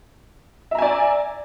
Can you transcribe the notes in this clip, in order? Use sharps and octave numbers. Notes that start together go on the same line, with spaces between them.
D5 E5 G#5 A#5